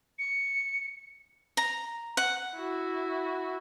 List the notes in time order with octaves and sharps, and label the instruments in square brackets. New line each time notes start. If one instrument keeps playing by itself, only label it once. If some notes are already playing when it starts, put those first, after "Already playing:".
[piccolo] C#7
[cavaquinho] A#5
F#5
[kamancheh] E4 F#4